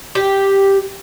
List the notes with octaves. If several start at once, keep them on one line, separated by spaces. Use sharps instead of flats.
G4